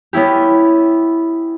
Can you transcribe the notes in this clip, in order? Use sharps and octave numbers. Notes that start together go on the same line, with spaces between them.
B3 C#4 E4 G4